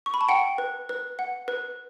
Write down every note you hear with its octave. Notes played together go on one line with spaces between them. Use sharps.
C#6
B5
A5
F#5 G5
B4
B4
F#5
B4